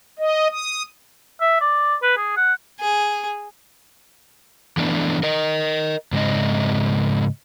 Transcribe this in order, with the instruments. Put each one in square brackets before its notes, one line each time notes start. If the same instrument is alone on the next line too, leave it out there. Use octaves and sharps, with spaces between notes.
[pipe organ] D#5
D#6
[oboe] E5
D5
B4
G#4
F#5
[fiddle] G#4
[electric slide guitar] E3 A3 B3 D4
A#4 D#5
G#2 C#3 G#3 C4 D#5